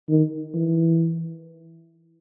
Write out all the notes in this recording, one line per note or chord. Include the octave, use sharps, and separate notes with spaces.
D#3
E3